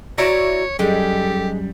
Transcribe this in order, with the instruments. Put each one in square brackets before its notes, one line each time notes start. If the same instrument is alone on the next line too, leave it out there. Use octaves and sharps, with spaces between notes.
[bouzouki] E4 D5 A#5 [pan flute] F#4 [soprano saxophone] C#5
[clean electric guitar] F#2 G3 [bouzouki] G#3 D#4 [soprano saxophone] G4 [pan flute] A4